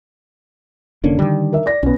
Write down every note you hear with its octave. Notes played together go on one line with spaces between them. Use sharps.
F1 D3 A#3 C#4
D3 D#3 G3
A#4 E5
D5 A#6
B1 B3 C#4